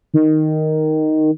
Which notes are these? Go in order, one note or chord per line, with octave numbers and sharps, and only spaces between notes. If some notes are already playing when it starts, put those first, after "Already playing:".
D#3